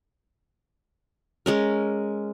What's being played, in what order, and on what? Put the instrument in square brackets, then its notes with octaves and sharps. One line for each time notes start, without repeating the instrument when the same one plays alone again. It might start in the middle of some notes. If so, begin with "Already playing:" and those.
[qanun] G#3 C#4 A#4